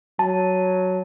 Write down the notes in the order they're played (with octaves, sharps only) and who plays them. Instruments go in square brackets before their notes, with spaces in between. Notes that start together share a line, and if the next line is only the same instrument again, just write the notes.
[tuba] F#3 [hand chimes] A5